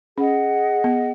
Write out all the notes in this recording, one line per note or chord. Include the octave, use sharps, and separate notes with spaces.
C#4 G#4 D#5 F#5
B3